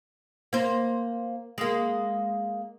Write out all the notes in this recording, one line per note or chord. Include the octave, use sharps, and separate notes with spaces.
A#3 C5
G#3 A#3